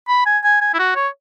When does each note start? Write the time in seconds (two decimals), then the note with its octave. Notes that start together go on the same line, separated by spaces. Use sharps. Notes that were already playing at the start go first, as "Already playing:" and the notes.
0.09 B5
0.26 G#5
0.44 G#5
0.61 G#5
0.74 E4
0.79 F#4
0.96 C#5